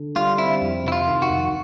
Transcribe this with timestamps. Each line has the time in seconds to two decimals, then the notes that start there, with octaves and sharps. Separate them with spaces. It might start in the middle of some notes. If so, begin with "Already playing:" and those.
Already playing: D3
0.16 G3 F4
0.38 C4 E4
0.61 F2
0.84 C3 E4
0.92 F4
1.07 D#3
1.22 F#4
1.30 F2